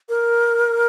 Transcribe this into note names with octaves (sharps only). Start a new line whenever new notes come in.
A#4